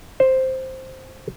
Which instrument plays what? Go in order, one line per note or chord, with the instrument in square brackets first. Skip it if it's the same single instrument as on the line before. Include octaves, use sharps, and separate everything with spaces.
[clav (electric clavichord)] C5